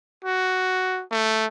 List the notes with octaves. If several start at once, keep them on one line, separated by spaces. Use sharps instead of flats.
F#4
A3